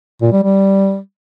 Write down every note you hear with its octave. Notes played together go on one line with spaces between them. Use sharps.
A#2
G3
G3